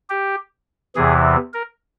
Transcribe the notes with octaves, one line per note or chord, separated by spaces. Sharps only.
G4
E2 C3 E3 G#4
A#4